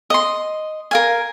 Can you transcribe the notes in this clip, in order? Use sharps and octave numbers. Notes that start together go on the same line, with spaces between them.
D#5 C6
A#4 F5 G#5